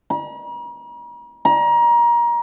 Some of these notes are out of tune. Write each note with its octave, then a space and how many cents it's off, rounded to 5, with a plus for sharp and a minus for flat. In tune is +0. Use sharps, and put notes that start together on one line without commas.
A#5 +45
A#5 +25